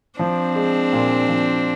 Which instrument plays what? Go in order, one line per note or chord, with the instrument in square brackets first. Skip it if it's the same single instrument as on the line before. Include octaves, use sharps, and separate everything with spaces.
[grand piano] F3 [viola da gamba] C4 D4
[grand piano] G#3
A#2
F3